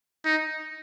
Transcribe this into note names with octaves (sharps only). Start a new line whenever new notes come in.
D#4